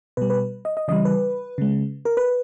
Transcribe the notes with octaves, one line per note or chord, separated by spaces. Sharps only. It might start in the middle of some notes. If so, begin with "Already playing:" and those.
B2 G3 B4
B4
D#5
D#5
C#3 E3 G3 D#5
B4
C#3 G#3
A#4
B4